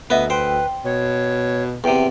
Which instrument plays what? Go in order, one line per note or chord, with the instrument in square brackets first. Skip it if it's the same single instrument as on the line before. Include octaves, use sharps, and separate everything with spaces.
[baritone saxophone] D2 [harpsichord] B3 [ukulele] B4 D#5 E5
[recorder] B4 [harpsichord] C5 [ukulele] G5
[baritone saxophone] B2 [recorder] C#5
[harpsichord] E2 C3 [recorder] G5